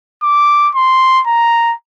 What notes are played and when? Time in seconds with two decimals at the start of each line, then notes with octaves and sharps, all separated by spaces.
0.23 D6
0.75 C6
1.27 A#5